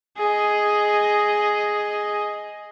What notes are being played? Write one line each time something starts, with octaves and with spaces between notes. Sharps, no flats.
G#4 D#5